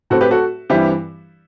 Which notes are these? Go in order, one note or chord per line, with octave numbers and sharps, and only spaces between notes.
A2 F#3 A3 C4 F#4 A4
G4 B4
F#4 A4
G2 E3 G3 C4 E4 G4